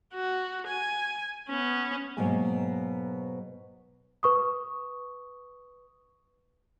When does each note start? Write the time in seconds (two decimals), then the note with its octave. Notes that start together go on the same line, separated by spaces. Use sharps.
0.14 F#4
0.67 G#5
1.49 B3 C#4
2.17 G#2 B2 F#3 A#3 G#5
4.23 B4 C#6 D#6